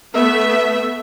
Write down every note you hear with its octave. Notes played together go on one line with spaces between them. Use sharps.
A3 B3 E5